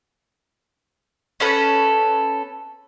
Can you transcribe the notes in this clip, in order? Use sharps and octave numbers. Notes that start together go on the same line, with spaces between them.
C#4 A4 B4